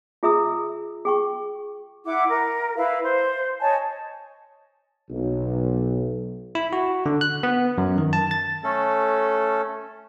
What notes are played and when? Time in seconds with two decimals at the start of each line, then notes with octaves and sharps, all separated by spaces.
0.23 F4 G#4 E5 A#5 D#6 E6
1.05 G#4 G5 C#6
2.05 E4 F#5 D6
2.27 A#4
2.76 E4 B4 F5
3.03 C5
3.61 C#5 D#5 G#5 A5
5.10 B1
6.55 E4
6.73 F#4
7.06 D3
7.21 F#6
7.43 B3
7.78 F#2
7.98 D#3
8.13 A5
8.31 A6
8.64 A3 C#4 A4